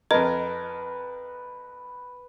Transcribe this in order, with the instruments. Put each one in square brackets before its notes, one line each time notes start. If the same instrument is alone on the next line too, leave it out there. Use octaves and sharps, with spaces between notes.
[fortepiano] F2 A#4 [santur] B4 [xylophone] D#5